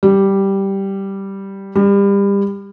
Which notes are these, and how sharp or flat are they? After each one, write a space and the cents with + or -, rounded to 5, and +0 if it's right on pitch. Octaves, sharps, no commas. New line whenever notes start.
G3 -5
G3 +30